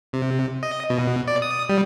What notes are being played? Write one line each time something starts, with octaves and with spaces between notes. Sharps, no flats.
C3
D#5
B2
D5
D#6
G3